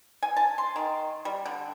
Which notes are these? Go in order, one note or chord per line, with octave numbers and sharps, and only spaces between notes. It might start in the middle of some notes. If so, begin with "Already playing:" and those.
G#5
A5
C6
D#3
G3
D3